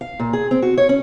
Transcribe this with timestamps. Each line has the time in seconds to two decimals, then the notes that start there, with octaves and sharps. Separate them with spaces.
0.01 F5
0.19 A#2
0.33 G#4
0.51 C4
0.62 F#4
0.78 C#5
0.89 C#4